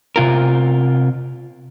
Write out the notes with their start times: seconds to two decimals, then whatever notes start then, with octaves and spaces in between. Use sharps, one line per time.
0.16 C3 F4 A#4